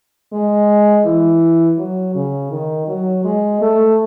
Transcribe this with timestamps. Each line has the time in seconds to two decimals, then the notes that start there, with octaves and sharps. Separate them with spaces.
0.33 G#3
1.05 E3
1.78 F#3
2.15 C#3
2.51 D#3
2.87 F#3
3.24 G#3
3.61 A3